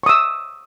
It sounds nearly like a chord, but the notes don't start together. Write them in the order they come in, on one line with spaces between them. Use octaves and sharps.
C#6 D#6 E6